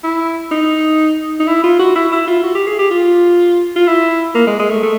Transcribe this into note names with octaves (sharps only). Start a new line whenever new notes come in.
E4
D#4
D#4
E4
F4
F#4
E4
E4
F4
F#4
G4
G#4
G4
F4
F4
E4
A#3
G#3
G#3
A3
A3